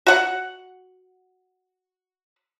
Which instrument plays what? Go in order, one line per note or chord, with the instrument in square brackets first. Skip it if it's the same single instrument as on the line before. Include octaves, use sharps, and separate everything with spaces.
[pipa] F#4 F#5